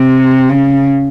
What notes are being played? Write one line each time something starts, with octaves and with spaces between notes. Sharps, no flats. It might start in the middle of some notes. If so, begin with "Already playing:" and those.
Already playing: C3
C#3